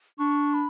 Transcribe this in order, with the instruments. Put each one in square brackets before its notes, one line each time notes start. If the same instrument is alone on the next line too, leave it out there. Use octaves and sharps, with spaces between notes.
[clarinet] D4 [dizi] C#6
[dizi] B5